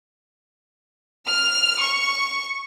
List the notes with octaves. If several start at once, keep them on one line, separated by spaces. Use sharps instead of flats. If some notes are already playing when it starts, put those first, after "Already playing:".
F6
C#6